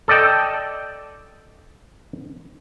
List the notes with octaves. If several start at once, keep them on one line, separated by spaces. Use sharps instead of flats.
A4 D5 D#5 G5 A5